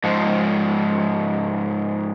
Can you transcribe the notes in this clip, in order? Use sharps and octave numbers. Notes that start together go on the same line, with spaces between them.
G#2 F3